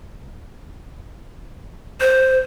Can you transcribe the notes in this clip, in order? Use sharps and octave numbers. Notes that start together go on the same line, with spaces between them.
C5